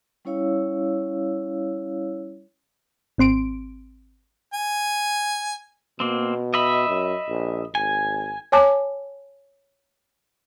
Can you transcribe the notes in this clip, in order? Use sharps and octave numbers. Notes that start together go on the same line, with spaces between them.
G3 C#4 E4 C#5 F5 E6
G#1 C4 C6 D7
G#5
B2 A#3 C4
D#5 E5 B5
F#2
A#1
G#1 G#5
C#5 G#5 A5 D6